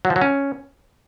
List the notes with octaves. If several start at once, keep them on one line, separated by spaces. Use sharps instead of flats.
F#3
F3
F#3
C#4